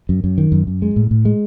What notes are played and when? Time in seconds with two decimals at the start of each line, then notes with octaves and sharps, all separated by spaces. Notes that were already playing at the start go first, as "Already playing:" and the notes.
0.09 F#2
0.24 F#2
0.38 D#3
0.52 F#2
0.67 F#2
0.82 G#3
0.96 A2
1.11 A2
1.25 G#3